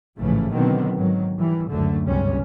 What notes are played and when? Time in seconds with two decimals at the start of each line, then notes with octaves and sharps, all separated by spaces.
0.19 A1 G#2 C#3 E3 F3 A3
0.52 B2 D3 D#3 F#3 B3 C4
0.95 G#2 D#3 F#3
1.37 E3 G3
1.68 F#1 D2 D3 A3
2.08 G1 C#2 C3 G3 C#4